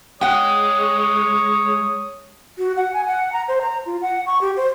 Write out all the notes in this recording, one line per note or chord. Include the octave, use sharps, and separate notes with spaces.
G#3 C#5 F#5 G5 D#6
F#4
F#5
G#5
F#5
A#5
C5
A#5
F4
F#5
C#6
G4
C5